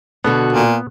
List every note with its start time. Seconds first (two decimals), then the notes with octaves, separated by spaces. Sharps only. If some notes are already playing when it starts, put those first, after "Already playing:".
0.24 B2 D3 B3 F#4
0.53 A#2